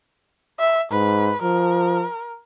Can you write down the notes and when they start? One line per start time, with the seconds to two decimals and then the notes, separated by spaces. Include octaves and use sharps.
0.59 E5
0.92 G#2 B4
1.42 F3 A#4